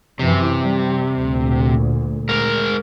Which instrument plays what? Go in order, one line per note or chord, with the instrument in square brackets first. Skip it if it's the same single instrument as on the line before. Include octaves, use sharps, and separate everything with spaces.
[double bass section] F#2 E3 [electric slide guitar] C3
[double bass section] G3
D2 A#2
[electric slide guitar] G#3 A#4